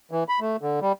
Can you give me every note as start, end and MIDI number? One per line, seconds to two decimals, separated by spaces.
0.11 0.24 52
0.29 0.40 83
0.40 0.56 57
0.62 0.80 50
0.82 0.92 55